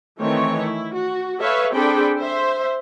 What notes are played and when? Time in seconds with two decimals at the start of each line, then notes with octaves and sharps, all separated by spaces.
0.20 D#3 E3 A3 C4 C#5
0.58 E4
0.93 F#4
1.40 A4 B4 C#5 E5 F5
1.73 C4 D4 G#4 A4 G5 B5
2.20 C5 E5